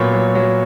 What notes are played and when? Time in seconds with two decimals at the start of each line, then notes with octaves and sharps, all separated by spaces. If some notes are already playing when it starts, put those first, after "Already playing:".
Already playing: A#2 F#3 B3 C#5
0.13 F#3
0.35 F#3